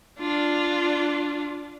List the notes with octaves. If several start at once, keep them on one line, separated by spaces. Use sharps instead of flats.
D4 F4